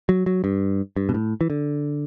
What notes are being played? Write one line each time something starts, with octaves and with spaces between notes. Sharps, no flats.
F#3
F#3
G2
G2
B2
A2
E3
D3